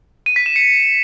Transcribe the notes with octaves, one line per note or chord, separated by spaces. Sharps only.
D#7
B6
E7
C#7